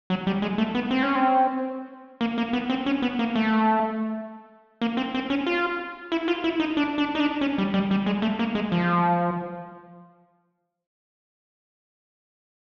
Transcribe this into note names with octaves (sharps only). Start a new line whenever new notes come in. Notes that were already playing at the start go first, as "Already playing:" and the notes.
F#3
G3
G#3
A3
B3
C4
C#4
C4
A#3
A#3
B3
C4
C#4
B3
A#3
A3
A#3
C4
C4
C#4
F4
E4
F4
E4
D#4
D4
D4
D#4
D4
C#4
G3
G3
G3
G#3
A3
A#3
G#3
F3